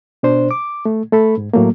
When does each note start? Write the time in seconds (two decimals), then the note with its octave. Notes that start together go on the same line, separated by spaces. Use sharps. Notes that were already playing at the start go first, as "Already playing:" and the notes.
0.23 B2 D4 C5
0.51 D6
0.85 A3
1.12 A3 A4 B5
1.38 G#2
1.53 A2 F#3 A3 A#3